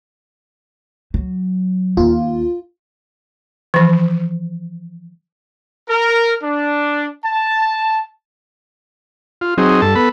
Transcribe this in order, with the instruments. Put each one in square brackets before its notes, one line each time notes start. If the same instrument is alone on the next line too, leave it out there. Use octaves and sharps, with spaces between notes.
[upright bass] F#3
[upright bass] D#2 [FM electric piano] F4
[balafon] E3 F3
[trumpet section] A#4
D4
A5
[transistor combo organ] F4
F#3 C4 D#4 G#4
G2 A4 A5
B3 A4 B5